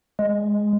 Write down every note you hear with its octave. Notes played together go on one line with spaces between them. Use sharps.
G#3